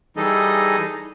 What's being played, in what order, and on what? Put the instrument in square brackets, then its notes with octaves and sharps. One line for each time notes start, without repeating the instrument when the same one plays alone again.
[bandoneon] E3 G3 D#4 G#4 A4 D#5